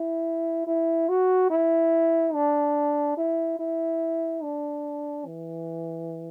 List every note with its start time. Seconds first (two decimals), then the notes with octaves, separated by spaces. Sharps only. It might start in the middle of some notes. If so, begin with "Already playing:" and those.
Already playing: E4
0.67 E4
1.09 F#4
1.50 E4
2.34 D4
3.18 E4
3.60 E4
4.43 D4
5.26 E3